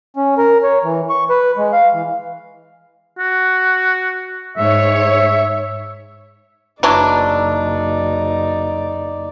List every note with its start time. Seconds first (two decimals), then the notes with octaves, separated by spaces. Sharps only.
0.16 C#4
0.38 A#4
0.63 C#5
0.83 E3
1.10 C#6
1.30 B4
1.57 G#3
1.73 F5
1.94 E3
3.19 F#4
4.57 G#2 C#5 E5
6.83 F#1 E3 F#3 D4 D#4 D5